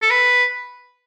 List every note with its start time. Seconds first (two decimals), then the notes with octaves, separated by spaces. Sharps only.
0.02 A4
0.10 B4